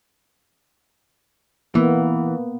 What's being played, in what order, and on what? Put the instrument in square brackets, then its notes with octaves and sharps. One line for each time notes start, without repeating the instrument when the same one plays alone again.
[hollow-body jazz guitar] E3 [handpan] A#3 B3